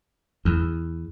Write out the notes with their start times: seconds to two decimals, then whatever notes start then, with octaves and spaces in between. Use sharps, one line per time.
0.45 E2